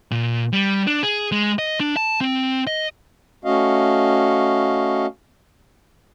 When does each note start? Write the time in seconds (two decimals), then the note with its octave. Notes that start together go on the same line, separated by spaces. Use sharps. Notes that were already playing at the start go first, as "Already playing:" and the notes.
0.11 A#2
0.53 G3
0.87 D4
1.03 G#4
1.32 G#3
1.59 D#5
1.80 D4
1.97 A5
2.21 C4
2.67 D#5
3.45 A3 C#4 F#4 D#5 F5